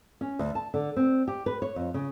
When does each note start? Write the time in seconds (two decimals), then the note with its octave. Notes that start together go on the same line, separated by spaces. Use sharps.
0.21 C#4
0.39 D2
0.55 A5
0.74 D3
0.96 C4
1.28 G4
1.46 B4
1.62 C#5
1.76 F2
1.94 C#3